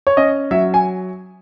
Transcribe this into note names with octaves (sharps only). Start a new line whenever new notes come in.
C#5
C#4 D#5
F#3 E5
G#5